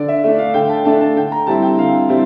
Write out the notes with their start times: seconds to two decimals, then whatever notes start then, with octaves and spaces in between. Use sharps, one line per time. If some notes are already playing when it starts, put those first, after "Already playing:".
Already playing: D3 D5
0.08 E5
0.24 A3 D4 E5
0.38 F5
0.54 D3 G5
0.69 A5
0.85 A3 D4 A5
1.01 A5
1.16 D3 G5
1.32 A#5
1.47 G3 C4 E4 A5
1.62 G5
1.78 D3 F5
2.08 G3 C4 E4